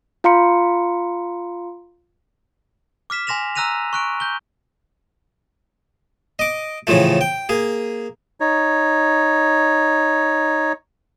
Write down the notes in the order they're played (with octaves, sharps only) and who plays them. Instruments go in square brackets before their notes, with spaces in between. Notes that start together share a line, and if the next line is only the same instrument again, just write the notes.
[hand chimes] F4 F5 A#5 C6 C#7
[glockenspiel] D6 F6 B6 E7
G#5 C6 A#6 E7 F7
A#5 E6 F#6 A#6 D#7 F7
C#6 F#6 D7
G6 G7
[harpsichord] D#5 D6
A2 C#3 E3 F3 A3
G5
A#3 G#4
[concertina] D#4 C#5